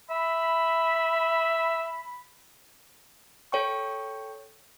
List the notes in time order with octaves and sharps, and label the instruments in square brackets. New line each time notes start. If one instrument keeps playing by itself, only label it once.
[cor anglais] E5 [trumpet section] B5
[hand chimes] A4 C#5 G5 C#6